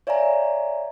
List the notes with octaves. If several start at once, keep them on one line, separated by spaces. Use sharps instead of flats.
C#5 D5 E5 F5 G#5 A#5